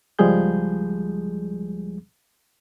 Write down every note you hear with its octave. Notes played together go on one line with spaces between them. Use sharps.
C#2 F3 G3 G#3 G#4 G6